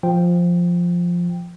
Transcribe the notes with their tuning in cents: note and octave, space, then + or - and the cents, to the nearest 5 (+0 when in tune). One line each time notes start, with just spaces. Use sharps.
F3 +0 G5 +0